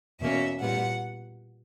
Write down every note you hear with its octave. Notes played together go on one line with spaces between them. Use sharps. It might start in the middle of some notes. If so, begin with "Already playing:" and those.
E2 B2 A#3 C#4 E5
A#2 G3 B3 F#5